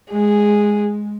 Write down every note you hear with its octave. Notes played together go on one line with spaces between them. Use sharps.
G#3 G#4